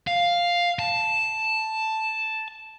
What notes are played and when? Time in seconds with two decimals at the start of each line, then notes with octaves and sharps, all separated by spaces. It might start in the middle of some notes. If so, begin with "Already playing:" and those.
0.07 F5
0.79 A5